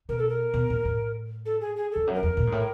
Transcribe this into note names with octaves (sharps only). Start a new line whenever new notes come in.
B2 A#4
A4
A#4
B2
A#2
A2
A4
G#4
G#4
F2 A4
F#2
A#4
F2
A#2
G#2
A2